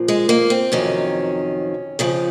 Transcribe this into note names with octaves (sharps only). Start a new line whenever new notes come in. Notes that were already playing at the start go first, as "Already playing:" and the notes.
Already playing: A#2 F3
G#3
A#3
C4
F2 C3 D#3 F#3 C#4
F2 C#3 F3